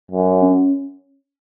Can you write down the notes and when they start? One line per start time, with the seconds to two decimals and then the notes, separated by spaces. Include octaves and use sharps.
0.11 F#2
0.42 C#4